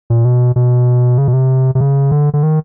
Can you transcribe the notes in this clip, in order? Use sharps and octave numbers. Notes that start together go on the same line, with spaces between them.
A#2
B2
B2
C#3
B2
C3
C3
C#3
D3
D3
D#3